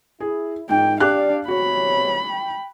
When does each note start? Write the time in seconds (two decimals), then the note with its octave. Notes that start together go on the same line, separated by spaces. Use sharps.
0.20 E4 G#4
0.69 G#2 D#4 F4 A#4 G5
1.00 D4 G4 D5 F5 F#6
1.48 C3 B3 F#4 C#5 B5
2.29 G5